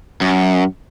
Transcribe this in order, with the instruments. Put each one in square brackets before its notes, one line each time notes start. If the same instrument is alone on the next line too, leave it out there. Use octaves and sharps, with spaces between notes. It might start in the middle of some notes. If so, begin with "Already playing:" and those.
[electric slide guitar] F#2